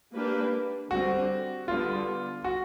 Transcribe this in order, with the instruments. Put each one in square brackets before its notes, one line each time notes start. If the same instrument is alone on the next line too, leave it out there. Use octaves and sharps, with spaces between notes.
[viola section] A#3 D4 G4 B4
[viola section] D3 G3 C4 [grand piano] F#4
[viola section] D3 G3 B3 [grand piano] F4
[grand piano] F#4